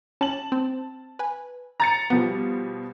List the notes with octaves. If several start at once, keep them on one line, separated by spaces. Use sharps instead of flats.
C#4 A5 F#7
C4
B4 G#5
A#5 A6 C#7
B2 F3 G3 B3